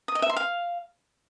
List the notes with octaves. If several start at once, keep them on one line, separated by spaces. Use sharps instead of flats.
D#6
D#5
E5
C6
F5